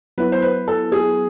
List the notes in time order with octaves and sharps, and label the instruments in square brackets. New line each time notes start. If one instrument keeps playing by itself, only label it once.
[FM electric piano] F#3 B3 E4 [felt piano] B4
[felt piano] C5
B4
A4
G#4